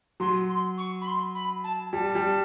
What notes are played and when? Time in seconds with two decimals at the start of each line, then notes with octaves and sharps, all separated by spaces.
0.20 F#3 C6
0.49 C6
0.77 C#6
1.01 B5
1.07 C6
1.35 B5
1.64 A5
1.93 G3 A5
2.15 G3